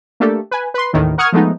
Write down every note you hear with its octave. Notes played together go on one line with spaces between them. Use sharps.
A3 A#3 D4 G4 A4
B4 G#5
B4 C6
A1 D#2 A2 D#3 E3
A#4 F#5 C#6 D#6 F6 G#6
F3 G#3 A3 B3 D#4